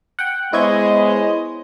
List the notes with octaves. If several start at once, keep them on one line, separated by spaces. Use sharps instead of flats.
F#5 G5
G#3 B3 E4 C5 C#5 D#5 G#6